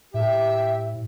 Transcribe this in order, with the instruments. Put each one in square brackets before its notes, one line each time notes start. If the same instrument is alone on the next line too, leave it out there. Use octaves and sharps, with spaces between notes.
[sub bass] A2 [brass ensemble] G4 [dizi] E5